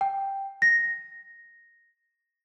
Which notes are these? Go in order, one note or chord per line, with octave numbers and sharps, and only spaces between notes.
G5
A#6